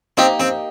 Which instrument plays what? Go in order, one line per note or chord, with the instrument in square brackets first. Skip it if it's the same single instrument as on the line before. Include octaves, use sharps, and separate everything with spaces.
[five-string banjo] A#3 D#4 G4 [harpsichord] C4
[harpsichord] C4